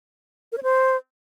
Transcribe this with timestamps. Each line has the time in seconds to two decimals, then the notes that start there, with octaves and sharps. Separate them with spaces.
0.52 A#4
0.58 C#5
0.63 C5